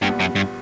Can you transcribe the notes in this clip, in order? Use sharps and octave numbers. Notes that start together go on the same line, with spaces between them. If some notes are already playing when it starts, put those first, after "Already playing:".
A#1 G2 A#2 G3 B3
F#2
G2